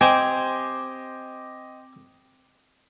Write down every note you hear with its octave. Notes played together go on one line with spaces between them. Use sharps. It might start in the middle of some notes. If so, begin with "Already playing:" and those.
C4 G4 C5 D#5 G#5